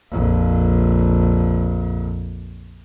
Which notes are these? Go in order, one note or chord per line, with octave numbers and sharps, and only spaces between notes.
A#1 F2